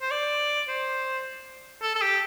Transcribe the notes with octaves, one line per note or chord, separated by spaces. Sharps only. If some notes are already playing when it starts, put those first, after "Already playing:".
C5
D5
C5
A4
A4
G4